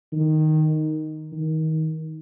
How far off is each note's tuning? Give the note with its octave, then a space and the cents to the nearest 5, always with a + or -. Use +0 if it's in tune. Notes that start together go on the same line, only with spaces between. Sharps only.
D#3 +0
D#3 +25